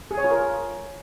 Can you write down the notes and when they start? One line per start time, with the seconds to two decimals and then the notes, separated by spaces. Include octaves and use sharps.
0.11 G#4
0.17 C#5
0.24 F4
0.31 A#4